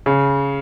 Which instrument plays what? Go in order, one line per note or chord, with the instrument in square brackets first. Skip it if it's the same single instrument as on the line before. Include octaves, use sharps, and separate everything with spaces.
[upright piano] C#3